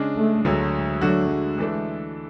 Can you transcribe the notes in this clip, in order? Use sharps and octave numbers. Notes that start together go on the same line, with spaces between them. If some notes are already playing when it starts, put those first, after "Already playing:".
Already playing: C#3 G#3 D4
A3
D2 D3 F#3 G#3
D3 F#3 A3 D4 F#4
G#3
E3 A3 D4 A4